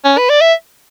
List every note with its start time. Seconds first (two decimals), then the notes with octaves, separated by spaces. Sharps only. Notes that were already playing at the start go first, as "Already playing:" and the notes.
0.05 C#4
0.18 B4
0.30 D5
0.41 E5